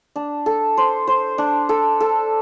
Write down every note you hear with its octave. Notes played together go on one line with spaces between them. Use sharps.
D4
A4
C5
C5
D4
A4
A4